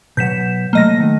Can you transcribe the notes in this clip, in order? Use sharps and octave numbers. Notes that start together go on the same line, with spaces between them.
B2 F#3 F#5 G6 B6 E7
C3 F#3 A3 A#3 D#5 A#6
D#3 A3